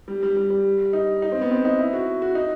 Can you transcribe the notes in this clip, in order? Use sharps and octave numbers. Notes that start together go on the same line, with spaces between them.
G3
G3
G3
G3
D#4
D#4
C4
B3
C4
D#4
E4
F#4
F#4
D#4